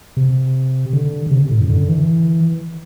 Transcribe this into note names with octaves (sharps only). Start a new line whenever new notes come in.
C3
D3
D3
C3
A2
F#2
D3
E3